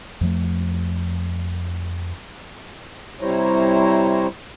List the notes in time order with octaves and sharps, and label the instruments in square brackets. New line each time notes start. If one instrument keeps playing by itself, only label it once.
[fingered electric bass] F2 F3 A3
[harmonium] C3 G3 E4 C5 C#5 A#5